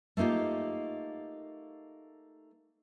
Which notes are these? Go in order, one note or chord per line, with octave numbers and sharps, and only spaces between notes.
A3 A#3 D#4 F4 G4